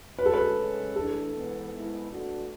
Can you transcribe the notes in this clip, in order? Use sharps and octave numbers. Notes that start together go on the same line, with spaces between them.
D3 G#3 C#4 F#4 B4
A4
B4
C#3 G#3 C#4
E3 A3 D4 A4
G#2 E3 B3
G#2 G#3 B3 E4
B2 A3 D4 F#4